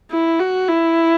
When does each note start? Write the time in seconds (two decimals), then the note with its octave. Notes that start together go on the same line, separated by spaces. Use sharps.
0.11 E4
0.40 F#4
0.68 E4